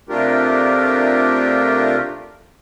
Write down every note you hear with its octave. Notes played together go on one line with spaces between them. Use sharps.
C3 A3 D4 F4 G4 A#4